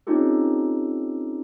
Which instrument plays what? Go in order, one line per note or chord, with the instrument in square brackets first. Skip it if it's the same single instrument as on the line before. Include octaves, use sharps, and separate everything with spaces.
[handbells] C4 C#4 D#4 F4 G4 A4